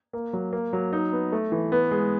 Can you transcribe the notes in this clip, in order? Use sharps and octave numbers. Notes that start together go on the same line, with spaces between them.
A#3
F#3
A#3
F#3
D#4
B3
A3
E3
B3
G#3